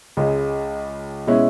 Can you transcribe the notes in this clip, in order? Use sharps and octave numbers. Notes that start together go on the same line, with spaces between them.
C#2 C#3 G#3
B2 G#3 C#4 E4